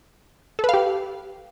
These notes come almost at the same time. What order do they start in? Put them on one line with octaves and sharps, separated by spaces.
A4 B4 F5 G4